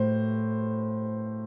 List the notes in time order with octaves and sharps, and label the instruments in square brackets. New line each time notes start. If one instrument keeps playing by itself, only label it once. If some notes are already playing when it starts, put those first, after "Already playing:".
Already playing: [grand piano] A2 [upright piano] C5